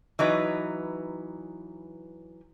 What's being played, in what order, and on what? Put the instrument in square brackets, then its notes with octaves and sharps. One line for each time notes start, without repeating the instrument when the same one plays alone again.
[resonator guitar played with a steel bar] E3 F#3 D#4 B4